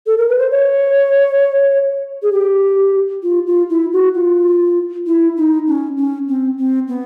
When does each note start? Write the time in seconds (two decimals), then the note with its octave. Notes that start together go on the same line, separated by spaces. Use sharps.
0.07 A4
0.18 A#4
0.29 B4
0.39 C5
0.50 C#5
2.23 G#4
2.33 G4
3.23 F4
3.47 F4
3.70 E4
3.93 F#4
4.15 F4
5.07 E4
5.37 D#4
5.67 C#4
5.97 C#4
6.28 C4
6.58 C4
6.88 B3